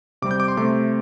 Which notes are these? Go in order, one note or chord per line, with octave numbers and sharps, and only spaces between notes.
C3 G3 C4 D6
G6
D6
C6
C3 A3 C4 D6